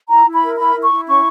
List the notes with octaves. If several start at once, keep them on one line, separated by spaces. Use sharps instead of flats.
E4 A#5
E4
B5
A#4
E4 B5
E4
C#6
E4
C#4 C#6